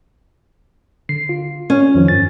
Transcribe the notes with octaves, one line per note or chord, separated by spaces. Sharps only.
D3 C7
F4
C#4
F2 D#3 F3
G2 A6